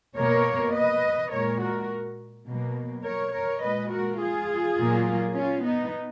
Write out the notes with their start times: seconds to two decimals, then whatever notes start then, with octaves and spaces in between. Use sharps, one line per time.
0.16 B2 A#3 A#4 C#5
0.74 B4 D#5
1.32 A#2 G#3 A#4 C#5
1.60 F#4 A#4
2.47 B2 F#3 A#3
3.04 A#4 C#5
3.33 A#4 C#5
3.62 A#2 G#3 B4 D#5
3.91 F#4 A#4
4.19 F4 G#4
4.77 A#2 F#3 A#3
5.35 C#4 F4
5.63 B3 D#4